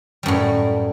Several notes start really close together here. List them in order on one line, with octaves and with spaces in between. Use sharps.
G3 F#2 A2